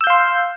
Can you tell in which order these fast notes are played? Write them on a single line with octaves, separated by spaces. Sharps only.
E6 G6 F5 C6